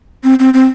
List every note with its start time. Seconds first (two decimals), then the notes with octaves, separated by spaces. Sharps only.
0.24 C4
0.39 C4
0.54 C4